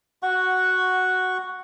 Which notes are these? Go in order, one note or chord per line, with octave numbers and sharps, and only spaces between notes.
F#4 F#5 C#6